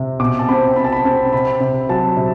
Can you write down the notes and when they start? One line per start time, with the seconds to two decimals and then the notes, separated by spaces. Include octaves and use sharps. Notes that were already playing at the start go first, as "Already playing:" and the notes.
Already playing: C3
0.20 B2 D6
0.39 A5
0.49 C4 B5
0.76 C4 B5
0.84 A5
0.92 B5
1.04 C4 A5
1.33 C3 B5
1.60 C3
1.89 F#3 A5
2.17 C3